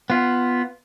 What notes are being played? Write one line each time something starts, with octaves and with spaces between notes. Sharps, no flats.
B3 F4